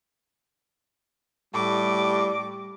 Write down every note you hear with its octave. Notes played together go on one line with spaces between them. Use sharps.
A2 G3 D6